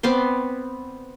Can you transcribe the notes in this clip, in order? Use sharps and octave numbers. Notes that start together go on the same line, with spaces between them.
B3 C4 D5 C6